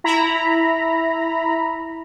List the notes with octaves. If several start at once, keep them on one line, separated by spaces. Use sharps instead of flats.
E4 A#5 B5